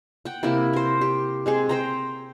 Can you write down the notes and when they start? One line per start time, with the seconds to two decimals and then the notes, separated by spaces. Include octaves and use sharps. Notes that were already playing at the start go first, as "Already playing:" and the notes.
0.25 F#5 G5
0.43 C3 A#3 E4
0.73 A#4 C5
1.01 G4
1.46 G#3 C4 G#4
1.69 C5 G5 A#5